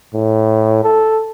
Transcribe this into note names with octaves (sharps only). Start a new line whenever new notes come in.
A2
A4